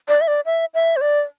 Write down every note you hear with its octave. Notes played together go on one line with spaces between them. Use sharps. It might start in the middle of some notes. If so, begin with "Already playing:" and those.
D5
E5
D5
E5
E5
C5
D5